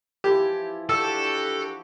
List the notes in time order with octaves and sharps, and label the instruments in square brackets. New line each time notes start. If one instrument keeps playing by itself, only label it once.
[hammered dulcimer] E3 F3 E4 [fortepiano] G4
[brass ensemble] D4 F#4 G4 [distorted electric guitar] A4 [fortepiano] E6